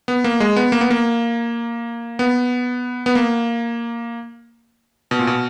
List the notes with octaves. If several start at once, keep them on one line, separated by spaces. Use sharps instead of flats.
B3
A#3
G#3
B3
A#3
B3
A#3
B3
B3
A#3
B2
A#2
B2